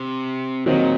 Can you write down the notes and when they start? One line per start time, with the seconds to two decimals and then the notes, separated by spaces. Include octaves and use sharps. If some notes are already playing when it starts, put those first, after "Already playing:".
Already playing: C3
0.66 A#2 D#3 F#3 C4 D#4